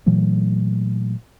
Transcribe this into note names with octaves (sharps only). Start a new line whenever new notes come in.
A#2 E3 F#3 A3